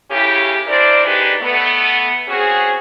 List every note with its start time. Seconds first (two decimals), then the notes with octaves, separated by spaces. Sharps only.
0.11 A2 C#3 C#4 E4 G4
0.68 D4 E4 A#4 C5 D5
1.05 D2 G#3 D4 D#4 G4 B4
1.42 A3 B3
2.28 C4 C#4 F#4 G#4